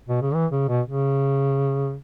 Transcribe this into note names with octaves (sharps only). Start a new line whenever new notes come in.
B2
C#3
E3
C#3
B2
C#3